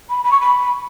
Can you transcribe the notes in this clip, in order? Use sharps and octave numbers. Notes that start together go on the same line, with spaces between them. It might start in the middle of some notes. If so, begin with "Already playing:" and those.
B5
B5
C#6
B5